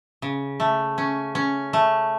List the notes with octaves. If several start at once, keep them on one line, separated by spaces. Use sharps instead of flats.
C#3
A3
C#4
C#4
A3